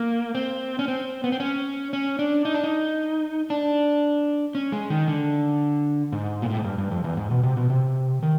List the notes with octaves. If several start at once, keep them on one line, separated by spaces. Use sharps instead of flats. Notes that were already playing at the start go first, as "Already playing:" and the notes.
Already playing: A#3
C4
C#4
C4
B3
C4
C#4
C#4
D4
D#4
D4
D#4
D4
C#4
G#3
D#3
D3
G#2
A#2
A2
G#2
G2
G2
F2
E2
G#2
B2
C3
B2
C3
D#3